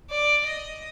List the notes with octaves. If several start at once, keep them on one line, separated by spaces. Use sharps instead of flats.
D5
D#5